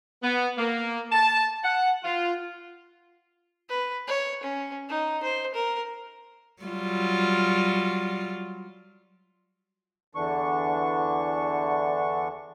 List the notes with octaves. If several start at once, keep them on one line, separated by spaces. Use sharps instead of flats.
B3
A#3
A5
F#5
F4
B4
C#5
C#4
D#4
C5
A#4
F#3 G3 F4
E2 D3 E3 D4 C#6